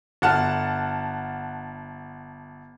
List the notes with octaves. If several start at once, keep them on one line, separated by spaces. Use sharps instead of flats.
G1 F#5 A5 F6